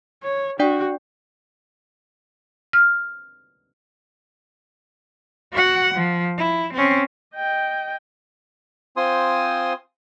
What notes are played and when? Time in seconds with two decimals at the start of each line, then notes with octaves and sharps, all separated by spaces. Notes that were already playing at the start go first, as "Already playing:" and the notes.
0.23 C#5
0.59 D4 F#4 D5 G5
2.73 F6
5.53 F#4 F#5
5.95 F3
6.38 E4
6.74 C4 C#4
7.35 D#5 G5
8.97 C4 F4 C5 G#5 C6 D#6